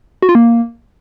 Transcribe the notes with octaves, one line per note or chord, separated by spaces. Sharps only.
F#4
F4
A#3